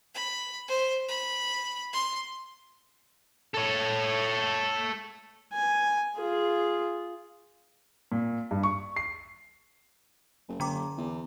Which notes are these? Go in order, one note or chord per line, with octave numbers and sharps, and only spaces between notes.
B5
C5
B5
C6
A4 C#5
G#5
F4 G#4
A#2
G2
C#6
C7
F#1
F#1 D3 A#5 D6
E2